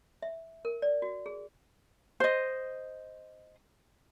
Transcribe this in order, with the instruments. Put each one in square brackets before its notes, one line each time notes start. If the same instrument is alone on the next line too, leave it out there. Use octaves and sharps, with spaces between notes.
[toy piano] E5
A#4
D5
F#4
G#4
[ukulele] C5 D#5